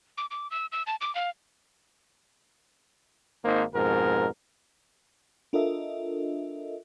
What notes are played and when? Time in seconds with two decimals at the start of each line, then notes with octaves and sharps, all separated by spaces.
0.18 D6
0.31 D6
0.51 E6
0.72 E6
0.87 A5
1.01 D6
1.15 F5
3.43 G#1 A#3 D#4 C5
3.74 F2 G#2 B2 A#4
5.53 D4 F4 A4 A#4 D#5 E5